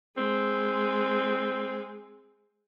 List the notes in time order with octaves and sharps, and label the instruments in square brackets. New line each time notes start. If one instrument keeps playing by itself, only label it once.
[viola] G#3 [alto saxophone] C4